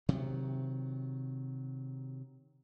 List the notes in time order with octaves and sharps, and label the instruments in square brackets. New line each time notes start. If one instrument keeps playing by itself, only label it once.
[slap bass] C3 D#3 F#3